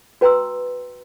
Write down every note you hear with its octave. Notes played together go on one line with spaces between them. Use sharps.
F#4 B4 G5 A#5 C6 E6